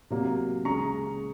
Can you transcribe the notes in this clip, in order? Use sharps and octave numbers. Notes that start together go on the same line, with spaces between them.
C3 F#3 A#3
C#3 G#3 A#5 C#6